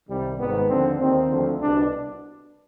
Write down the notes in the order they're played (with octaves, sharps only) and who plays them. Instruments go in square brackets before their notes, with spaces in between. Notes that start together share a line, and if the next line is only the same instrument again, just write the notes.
[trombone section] C2 C3 D#3 G3
G#1 G#2 D#3 B3
D#2 D3 F3 C4
D#2 D#3 C4
D2 D3 F3
C2 B2 D4